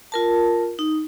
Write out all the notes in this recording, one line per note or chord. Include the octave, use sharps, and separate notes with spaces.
F4 A#4 A5
D#4